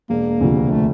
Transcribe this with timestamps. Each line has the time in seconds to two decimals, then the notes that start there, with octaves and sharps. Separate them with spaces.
0.10 E1 A#3
0.41 D2 C3 F3
0.71 A3